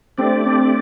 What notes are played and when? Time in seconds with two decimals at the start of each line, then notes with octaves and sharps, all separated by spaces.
0.18 A3 C4 D4 G4 D5
0.45 C4